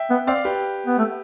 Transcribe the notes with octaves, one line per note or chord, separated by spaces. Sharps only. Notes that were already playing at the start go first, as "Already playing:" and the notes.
Already playing: E5 G5
B3
C4 D5 F5
G4 B4
B3
A3